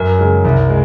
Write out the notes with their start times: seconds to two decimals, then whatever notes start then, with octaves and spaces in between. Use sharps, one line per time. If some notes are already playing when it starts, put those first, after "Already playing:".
Already playing: F#2 A#4
0.18 C#3 G#3
0.45 C2
0.70 G#3